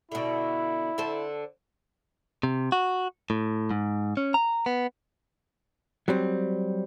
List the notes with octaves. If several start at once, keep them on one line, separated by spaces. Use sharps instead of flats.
B2 D3 E4
D3 A4 C5
C3
F#4
A2
G#2
C#4
A#5
B3
F#3 G3 C4